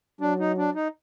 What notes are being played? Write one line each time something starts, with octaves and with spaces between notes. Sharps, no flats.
F#3 D4
D#4
D4
D#4